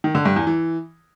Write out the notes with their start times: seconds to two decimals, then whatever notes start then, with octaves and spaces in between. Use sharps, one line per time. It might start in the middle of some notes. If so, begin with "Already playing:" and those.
0.04 D#3
0.15 D3
0.25 G2
0.36 E2
0.47 E3